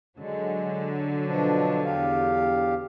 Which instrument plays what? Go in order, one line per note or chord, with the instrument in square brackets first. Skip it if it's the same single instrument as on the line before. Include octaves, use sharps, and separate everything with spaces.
[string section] D3 F#3 [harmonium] G#3
[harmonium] B2 F3 D4
E2 G4 F5